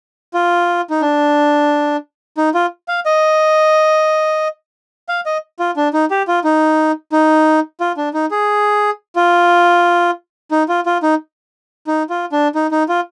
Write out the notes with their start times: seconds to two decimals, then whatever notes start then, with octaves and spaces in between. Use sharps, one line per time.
0.34 F4
0.90 D#4
1.02 D4
2.37 D#4
2.54 F4
2.88 F5
3.06 D#5
5.09 F5
5.26 D#5
5.59 F4
5.76 D4
5.93 D#4
6.11 G4
6.28 F4
6.44 D#4
7.12 D#4
7.80 F4
7.97 D4
8.14 D#4
8.31 G#4
9.16 F4
10.51 D#4
10.69 F4
10.86 F4
11.03 D#4
11.87 D#4
12.10 F4
12.32 D4
12.55 D#4
12.71 D#4
12.89 F4